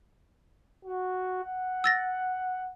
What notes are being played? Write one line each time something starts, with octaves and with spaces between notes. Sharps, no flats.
F#4
F#5
E6 A6 A#6